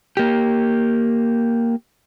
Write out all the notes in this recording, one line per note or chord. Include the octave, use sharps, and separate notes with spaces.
A#3 G4